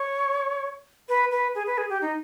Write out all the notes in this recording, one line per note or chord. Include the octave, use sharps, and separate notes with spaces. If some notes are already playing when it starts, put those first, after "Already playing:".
Already playing: C#5
B4
B4
G#4
B4
G#4
G4
D#4